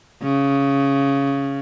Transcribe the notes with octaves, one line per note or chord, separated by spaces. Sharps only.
C#3